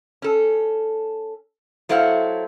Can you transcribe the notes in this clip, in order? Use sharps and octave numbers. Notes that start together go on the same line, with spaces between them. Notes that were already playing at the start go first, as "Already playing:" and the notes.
C#4 A4
F#3 A3 E4 C5 F5 F#5